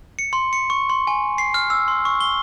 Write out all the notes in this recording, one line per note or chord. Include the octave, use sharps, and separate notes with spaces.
C#7
C6
C#7
C#6
C6
G#5
C7
F6
E6
C6
C#6
G7